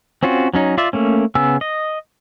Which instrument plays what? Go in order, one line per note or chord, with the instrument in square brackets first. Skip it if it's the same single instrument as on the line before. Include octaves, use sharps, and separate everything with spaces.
[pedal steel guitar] C4 C#4 F4 F#4
F#3 C#4 D#4
F4 D5 E5
A3 A#3 C#4
C#3 B3 G#5 E6
D#5